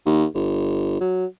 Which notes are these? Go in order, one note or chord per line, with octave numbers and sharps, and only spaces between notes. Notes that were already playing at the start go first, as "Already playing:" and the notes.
D#2
G1
F#3